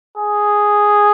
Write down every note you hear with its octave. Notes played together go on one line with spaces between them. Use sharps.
G#4